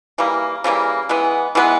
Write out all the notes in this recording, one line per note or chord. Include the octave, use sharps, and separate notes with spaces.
C#3 E3 G3 A#3
C#3 E3 G3 A#3
E3 G#3 B3
E3 G#3 B3